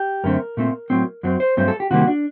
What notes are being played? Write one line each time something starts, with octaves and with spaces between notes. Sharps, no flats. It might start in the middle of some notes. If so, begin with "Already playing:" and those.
Already playing: G4
F#2 D3 A3 C4 A#4
A#2 A3 C4
A2 F#3 C4
F#2 F#3 C4
C5
G2 F#3 A3 C4 C5
A4
G4
C3 D#3 G3 A#3 F#4
D4